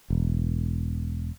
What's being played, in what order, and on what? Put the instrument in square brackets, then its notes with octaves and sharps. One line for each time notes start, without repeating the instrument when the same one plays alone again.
[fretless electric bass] E1